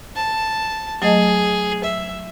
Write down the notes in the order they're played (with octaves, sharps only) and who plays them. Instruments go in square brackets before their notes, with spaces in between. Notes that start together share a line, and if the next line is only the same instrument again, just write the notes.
[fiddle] A5
[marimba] F#3 A3 D#5 [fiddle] G#4
[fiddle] E5